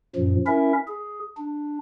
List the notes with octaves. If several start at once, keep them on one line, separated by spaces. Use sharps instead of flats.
F#2 A#2 F3
C#4 E4 A#4 E5
G#4
D4